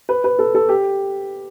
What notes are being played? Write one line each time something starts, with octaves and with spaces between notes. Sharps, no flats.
B4
B4
A4
A4
G4